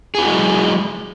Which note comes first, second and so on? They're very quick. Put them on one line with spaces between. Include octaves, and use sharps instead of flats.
G#4 E4 F#4 G#3 F#3